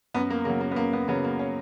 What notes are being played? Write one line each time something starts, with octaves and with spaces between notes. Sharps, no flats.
F#2 B3
A#3
C#3 F#3 A#3
A#3
B3
F#2 A#3
B3
C#3 F#3 B3
A#3
C#4